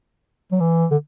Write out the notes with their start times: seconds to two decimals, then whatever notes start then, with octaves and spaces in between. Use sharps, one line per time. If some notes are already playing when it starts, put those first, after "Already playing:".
0.52 F#3
0.60 E3
0.91 D3